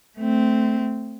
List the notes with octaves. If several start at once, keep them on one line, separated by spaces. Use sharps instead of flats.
A3 C4